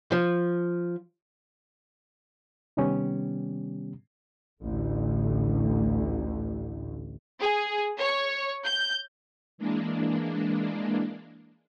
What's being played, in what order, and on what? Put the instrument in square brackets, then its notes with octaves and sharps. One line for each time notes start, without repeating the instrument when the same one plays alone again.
[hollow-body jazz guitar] F3
[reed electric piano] C3 D#3 G3 B3 C#4 G4
[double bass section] A1 D2
[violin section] G#4
C#5
G6
[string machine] E3 G#3 A#3 D4